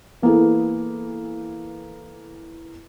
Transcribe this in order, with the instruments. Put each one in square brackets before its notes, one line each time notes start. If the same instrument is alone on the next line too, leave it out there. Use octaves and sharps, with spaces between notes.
[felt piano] E3 A#3 B3 E4 G#4 A4